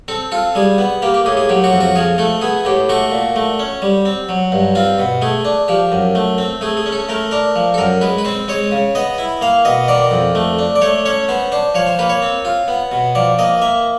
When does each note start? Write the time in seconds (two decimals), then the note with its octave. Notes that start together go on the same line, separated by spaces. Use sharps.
0.08 C4 A4
0.32 F4 A4
0.55 G3 G#4
0.78 B3
1.02 A#3 G4
1.14 G4
1.26 A2 G#4
1.37 G#4
1.49 F#3 G4
1.64 F#4
1.73 F2
1.81 F#4
1.95 F3 G#4
2.18 A3 A4
2.42 B3 G#4
2.65 A2 G4
2.89 A3 F#4
3.11 A#2
3.36 A3
3.59 C#4
3.82 G3
4.05 C4
4.29 F#3
4.52 G2
4.75 C4 F4
4.99 B2
5.22 A3 G#4
5.45 D4
5.68 F3 G4
5.92 F#2
6.15 A3
6.38 C4
6.61 A3 G#4
6.77 G#4
6.86 C#4
6.92 A4
7.09 A3 A#4
7.31 D4 A#4
7.56 F3
7.74 A4
7.78 F#2 A#4
8.01 G#3 B4
8.18 B4
8.25 C4 C5
8.48 G#3 C#5
8.72 C#3
8.95 B3 D#5
9.18 E4
9.41 A#3 F5
9.65 B2 D#5
9.88 D#3 D5
10.11 F2
10.35 A3
10.59 D4
10.76 D5
10.81 A3 C#5
11.05 C#4 C#5
11.28 B3 C5
11.52 D4 C5
11.74 F3 C#5
11.87 C5
11.99 A#3 B4
12.09 C#5
12.22 C4
12.45 F4
12.68 B3
12.92 B2
13.15 F3 D5
13.39 A#3 D#5
13.62 A#3 E5